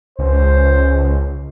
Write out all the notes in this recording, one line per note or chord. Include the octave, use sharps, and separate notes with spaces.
C#2 C5